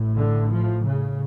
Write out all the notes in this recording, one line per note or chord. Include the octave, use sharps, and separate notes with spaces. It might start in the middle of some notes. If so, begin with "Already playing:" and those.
Already playing: A1 A2
D3
F3
C#3